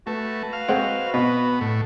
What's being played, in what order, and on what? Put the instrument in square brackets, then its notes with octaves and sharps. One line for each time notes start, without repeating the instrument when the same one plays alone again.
[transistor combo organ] A3 [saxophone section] F#4 B4
[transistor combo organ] F5
[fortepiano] G#3 C4 F#5
[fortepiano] B2 [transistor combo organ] B3
[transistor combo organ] A2